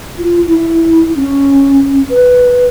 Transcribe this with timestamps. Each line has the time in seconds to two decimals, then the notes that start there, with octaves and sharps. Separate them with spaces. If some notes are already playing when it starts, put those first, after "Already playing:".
0.18 F4
0.47 E4
1.16 C#4
2.10 B4